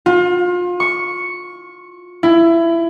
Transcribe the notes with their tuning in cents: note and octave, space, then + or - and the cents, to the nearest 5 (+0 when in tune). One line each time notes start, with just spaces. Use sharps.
F4 +30
C#6 +0
E4 +20